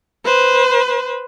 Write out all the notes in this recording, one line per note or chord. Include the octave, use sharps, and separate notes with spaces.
B4 C5